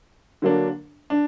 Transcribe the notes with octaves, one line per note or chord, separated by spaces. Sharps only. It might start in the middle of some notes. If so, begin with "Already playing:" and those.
D3 F#3 A#3 D4
D4